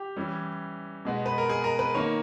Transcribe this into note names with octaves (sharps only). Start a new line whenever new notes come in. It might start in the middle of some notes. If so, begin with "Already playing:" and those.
Already playing: G4
E3 G3 C#4
B2 G#3 B3
B4
A#4
G#4
A#4
B4
D#3 A#3 D#4 C#5